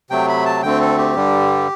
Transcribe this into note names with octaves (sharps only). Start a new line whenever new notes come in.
C3 F#3 A3 G5
B5
A5
D2 D3 A3 C4 G5
A4
G4
G2 D3 G3